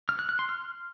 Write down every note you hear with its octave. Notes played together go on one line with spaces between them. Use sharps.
F6
F#6
F#6
C6
F6